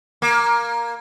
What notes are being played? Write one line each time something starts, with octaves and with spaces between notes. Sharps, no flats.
A#3